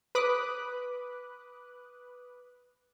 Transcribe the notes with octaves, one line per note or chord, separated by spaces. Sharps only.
B4 B5 D6 D#6 F#6